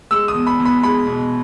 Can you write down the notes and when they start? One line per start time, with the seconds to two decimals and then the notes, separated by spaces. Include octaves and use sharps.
0.11 G#3 E6
0.28 D#6
0.34 E2
0.47 B5
0.60 E2
0.65 B5
0.83 G#3 B5
1.07 B2